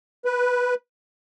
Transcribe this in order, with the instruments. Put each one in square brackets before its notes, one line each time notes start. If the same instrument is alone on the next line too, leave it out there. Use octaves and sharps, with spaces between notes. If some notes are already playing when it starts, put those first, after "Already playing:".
[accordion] B4